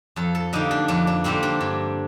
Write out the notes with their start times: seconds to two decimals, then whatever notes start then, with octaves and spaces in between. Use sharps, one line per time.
0.16 F2 A4
0.35 A4
0.53 D3 G3 A#3 D#4
0.71 D4
0.88 F2 D4
1.07 D4
1.24 D3 G3 A#3 C4
1.43 D4
1.61 G2